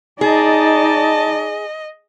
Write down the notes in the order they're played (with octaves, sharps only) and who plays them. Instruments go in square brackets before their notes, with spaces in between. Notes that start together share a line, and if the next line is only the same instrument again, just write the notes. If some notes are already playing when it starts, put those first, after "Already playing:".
[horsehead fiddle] D#4 D5 [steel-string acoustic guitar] G#4 [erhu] D#5 [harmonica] A5